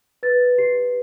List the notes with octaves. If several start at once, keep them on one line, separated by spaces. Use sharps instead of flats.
B4 A6
G4 C7